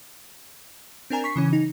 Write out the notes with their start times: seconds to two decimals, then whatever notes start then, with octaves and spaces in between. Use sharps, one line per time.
1.10 C4 D4 A#4 G#5 A#5
1.24 C#6 B6 C7
1.36 C#3 E3 C#4
1.53 D#4